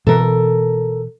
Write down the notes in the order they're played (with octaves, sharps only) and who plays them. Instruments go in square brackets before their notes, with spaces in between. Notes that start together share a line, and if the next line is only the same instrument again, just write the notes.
[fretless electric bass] B2 E3 [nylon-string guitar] A4 A#4